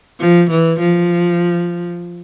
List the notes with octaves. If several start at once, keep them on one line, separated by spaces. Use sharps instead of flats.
F3
E3
F3